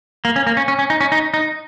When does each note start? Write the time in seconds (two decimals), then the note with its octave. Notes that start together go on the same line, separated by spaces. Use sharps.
0.25 A#3
0.36 C#4
0.47 A#3
0.57 C#4
0.68 C#4
0.79 C#4
0.90 D#4
1.01 C#4
1.12 D#4
1.34 D#4